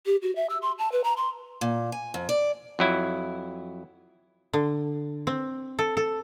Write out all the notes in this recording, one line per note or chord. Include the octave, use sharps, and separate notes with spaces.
G4
F#4
E5
E6
C6
A5
B4
A#5
C6
A#2
G#5
F2
D5
F2 F#3 E4
D3
C4
A4
A4